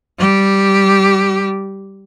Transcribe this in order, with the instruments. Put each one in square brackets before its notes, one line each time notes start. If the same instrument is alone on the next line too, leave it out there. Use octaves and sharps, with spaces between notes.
[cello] G3 G4